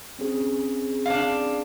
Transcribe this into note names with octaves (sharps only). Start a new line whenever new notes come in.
C4 C#4 G#4
D4 F5